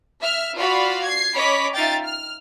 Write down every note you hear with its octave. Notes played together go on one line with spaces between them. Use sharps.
E5 F6
F4 F#4 D5 F5 B5
G#6 C7
C#4 C#5 D#5 B5 D6 B6
D#4 F4 E5 F5 G5 A6
F6